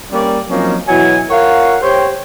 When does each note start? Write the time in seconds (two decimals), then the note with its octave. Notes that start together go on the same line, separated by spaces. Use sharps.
0.12 G3 A#3 C#4 D5
0.49 F3 F#3 A#3 C4 C#4 D#4
0.88 B2 E3 F#3 E4 G#5
1.30 F4 A#4 C#5 F5 F#5
1.83 G4 C5 C#5